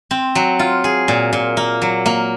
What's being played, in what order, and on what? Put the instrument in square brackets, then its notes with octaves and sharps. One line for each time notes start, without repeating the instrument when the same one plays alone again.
[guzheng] C4
F#3
F4
G#4
A#2
A#2
A#3
F#3
A#3